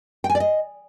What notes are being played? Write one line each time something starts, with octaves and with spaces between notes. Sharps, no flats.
G5
G#5
D5
D#5